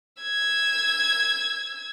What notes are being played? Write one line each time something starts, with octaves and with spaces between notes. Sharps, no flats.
E6 G#6